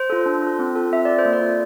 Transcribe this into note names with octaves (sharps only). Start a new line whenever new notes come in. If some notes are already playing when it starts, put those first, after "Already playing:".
Already playing: C5
F4 A4
D4
F4 A4
C4
F4 A4
C4 E5
F4 A4 D5
C5
A#3
D5
F4 A4